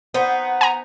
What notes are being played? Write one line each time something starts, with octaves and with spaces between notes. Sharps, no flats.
B3 D#4 C5 F#5
G#5 A#5